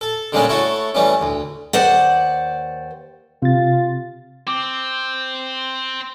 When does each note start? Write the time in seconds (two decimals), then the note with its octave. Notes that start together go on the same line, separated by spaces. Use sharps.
0.01 A4
0.32 D3 G3 G#3 A#3 C#4 D4
0.49 A3 E4 F#4 A4 C#5
0.95 E3 G3 A3 C#4
1.21 D2
1.73 D#2 C5 D5 F#5
3.42 C3 F4 A6
4.47 C4 D6